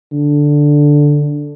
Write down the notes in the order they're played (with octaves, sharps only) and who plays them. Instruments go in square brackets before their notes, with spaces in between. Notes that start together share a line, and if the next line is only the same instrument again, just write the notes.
[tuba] D3